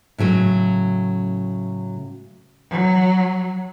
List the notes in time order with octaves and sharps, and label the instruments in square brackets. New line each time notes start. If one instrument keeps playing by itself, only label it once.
[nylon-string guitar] A2 C#3 F#3 A3
[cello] F#3